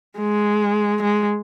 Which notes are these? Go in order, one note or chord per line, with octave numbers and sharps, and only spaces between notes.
G#3
G#3